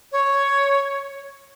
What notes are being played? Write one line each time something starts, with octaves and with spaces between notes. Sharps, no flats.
C#5